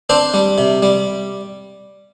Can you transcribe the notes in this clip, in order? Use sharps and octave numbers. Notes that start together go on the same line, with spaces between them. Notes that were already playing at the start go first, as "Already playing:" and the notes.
C4 D4 C5
G3
C3
G3